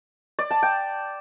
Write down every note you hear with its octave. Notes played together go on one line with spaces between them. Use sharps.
D5
A5
G5